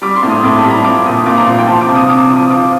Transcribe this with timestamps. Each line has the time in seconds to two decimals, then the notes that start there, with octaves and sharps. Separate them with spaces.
0.02 G3 D6
0.16 C6
0.23 A2
0.29 D#6
0.44 A2 D6
0.58 A5
0.64 G3
0.71 A#5
0.84 F3 D6
1.06 A#2 D#6
1.26 A#2 D6
1.37 A#5
1.47 F3 C6
1.58 G5
1.67 F3 A5
1.81 D6
1.88 C3
1.95 D#6
2.09 C3 D6
2.29 F3
2.36 D#6
2.50 F3 D6